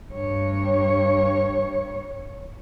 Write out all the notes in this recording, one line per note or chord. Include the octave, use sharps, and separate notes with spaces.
G2 C#5